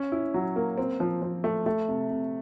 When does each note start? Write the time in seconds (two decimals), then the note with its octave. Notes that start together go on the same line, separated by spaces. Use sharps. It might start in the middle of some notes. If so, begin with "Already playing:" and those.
Already playing: C#4
0.12 E4
0.34 F#3
0.56 A#3
0.78 C4
1.00 F3
1.22 F3
1.44 A3
1.66 A3
1.88 C3
2.10 C3